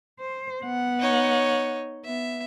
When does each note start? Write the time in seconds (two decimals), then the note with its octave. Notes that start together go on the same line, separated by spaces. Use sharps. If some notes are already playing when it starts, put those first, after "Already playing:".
0.20 C5
0.63 B3 F#5
0.99 D#4 C#5
2.05 B3 E5